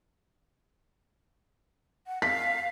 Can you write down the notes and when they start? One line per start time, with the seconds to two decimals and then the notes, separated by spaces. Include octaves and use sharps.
2.07 F#5
2.22 F5 B6